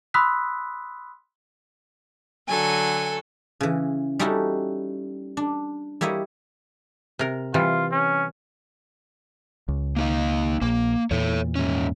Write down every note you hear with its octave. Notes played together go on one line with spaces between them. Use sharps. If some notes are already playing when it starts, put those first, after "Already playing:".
B5 C6 D#6 E6 F#6 B6
D3 F#3 F#4 A4 G#5
C#3 E3
G3 C#4 D#4 E4 F#4 A4
D4
G3 A#3 E4 C#5 D#5
C3 A#4
C3 E3 G3 F4
C#4
C#2
A#3 D#4 F5
A#1 A#3
E2 A#2 A4 C#5
G#2 C#4